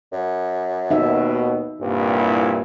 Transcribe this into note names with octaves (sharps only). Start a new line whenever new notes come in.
F#2
D#2 B2 D#4 E5
C2 G2 A#2
E4